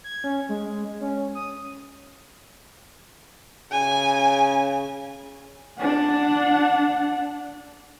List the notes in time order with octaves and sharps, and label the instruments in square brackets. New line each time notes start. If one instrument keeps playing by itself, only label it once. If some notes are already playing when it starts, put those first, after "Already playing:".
[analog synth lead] G#6
C#4
G#3
C#4
D#6
[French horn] C#3 [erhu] G#5
[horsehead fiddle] D4 F#5